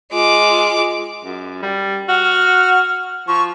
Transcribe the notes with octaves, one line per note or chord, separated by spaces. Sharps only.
G#3 F4 D6
F#2
G3
F#4 F6
F3 C#6